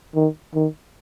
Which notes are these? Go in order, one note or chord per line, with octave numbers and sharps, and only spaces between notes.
D#3
D#3